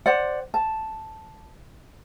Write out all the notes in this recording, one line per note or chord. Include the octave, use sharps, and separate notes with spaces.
C5 D5 F#5
A5